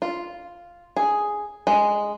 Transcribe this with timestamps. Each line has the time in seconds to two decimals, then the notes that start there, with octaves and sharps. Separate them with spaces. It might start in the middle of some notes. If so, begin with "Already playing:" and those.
0.02 F4
0.97 G#4
1.67 G#3